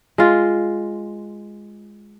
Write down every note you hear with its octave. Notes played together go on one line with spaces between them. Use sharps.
G#3 F4